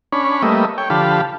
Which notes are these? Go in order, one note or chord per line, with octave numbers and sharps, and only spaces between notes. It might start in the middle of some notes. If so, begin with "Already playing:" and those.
C#4 D4 C#5 B5
G3 A3 A#3 B4 D#5 E5
C#5 G5
D3 F3 G4 F5 A5 B5